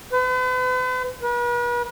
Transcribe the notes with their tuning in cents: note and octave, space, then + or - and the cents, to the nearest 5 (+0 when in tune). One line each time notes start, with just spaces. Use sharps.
B4 +45
B4 -40